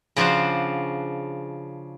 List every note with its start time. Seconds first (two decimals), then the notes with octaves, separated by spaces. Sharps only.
0.17 C#3 F3 D4 F#4 C5